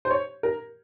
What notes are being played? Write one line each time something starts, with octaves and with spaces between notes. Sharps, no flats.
C5
C#5
A#4